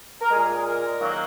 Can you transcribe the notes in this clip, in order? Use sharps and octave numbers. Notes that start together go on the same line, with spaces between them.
A#4
A#2 G#3 G#4
A#4
D#3 F#3 A#3